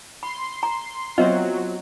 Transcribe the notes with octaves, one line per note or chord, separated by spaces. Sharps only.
B5 C6
A#5
F#3 B3 C4 F4 F#4 C5 D#5 E5